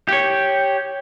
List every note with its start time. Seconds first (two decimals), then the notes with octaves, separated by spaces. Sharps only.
0.08 G4 C#5